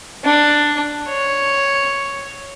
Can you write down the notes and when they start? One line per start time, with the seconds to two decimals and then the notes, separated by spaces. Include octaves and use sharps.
0.25 D4
1.09 C#5